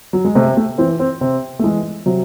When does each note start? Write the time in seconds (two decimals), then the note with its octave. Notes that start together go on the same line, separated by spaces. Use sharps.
0.13 F#3
0.25 G#3
0.35 C3 A3
0.57 A3
0.78 E3 C4
1.00 C4
1.21 C3 C4
1.59 A3
1.64 E3 G#3
2.06 C3 F#3